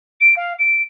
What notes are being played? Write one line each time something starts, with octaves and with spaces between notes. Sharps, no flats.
D7
F5
D7